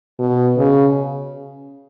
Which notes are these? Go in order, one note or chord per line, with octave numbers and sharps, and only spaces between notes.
B2
C#3